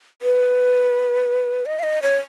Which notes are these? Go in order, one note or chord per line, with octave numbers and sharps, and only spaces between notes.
B4
D#5
F5
D#5
C#5